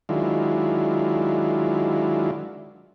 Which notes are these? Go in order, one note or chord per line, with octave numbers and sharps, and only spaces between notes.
D#3 F#3 G#3 D4 E4 F4